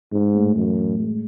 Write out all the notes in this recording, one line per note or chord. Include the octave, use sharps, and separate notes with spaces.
G#2 G#3
A2
F#2 E3
A2
G#3